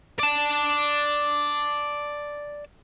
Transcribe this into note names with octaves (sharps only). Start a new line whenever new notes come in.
D5 A5